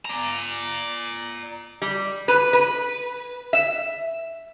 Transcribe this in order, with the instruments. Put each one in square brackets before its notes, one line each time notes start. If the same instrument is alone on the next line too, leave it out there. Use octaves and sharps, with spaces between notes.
[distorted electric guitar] D5 A#5
[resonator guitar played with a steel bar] G3
B4
B4
E5